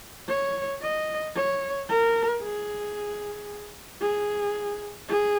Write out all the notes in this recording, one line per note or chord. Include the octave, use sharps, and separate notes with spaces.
C#5
D#5
C#5
A#4
G#4
G#4
G#4